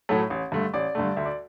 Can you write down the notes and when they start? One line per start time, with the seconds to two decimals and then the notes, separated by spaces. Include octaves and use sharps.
0.09 A2 F#3 A3
0.30 A1
0.52 G2 D3 A3
0.74 A1 D5
0.95 G2 D3 A3
1.16 D2 E5
1.26 D5